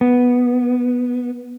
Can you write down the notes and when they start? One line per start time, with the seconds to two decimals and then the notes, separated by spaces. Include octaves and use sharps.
0.01 B3